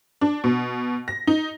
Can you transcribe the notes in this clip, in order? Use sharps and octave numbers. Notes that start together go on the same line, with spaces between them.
D4
B2
A#6
D#4